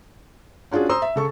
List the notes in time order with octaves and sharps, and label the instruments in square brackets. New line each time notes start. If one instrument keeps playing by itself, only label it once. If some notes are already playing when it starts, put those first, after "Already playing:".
[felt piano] C#4 D4 F4 F#4 G#4
C5 A#5 C6 D#6 E6
E5
C#3 A4 C#6